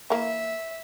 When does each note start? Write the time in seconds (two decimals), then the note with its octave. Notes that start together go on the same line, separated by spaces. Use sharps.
0.10 E3 A#3 E5